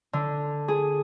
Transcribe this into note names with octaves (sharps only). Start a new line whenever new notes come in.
D3
G#4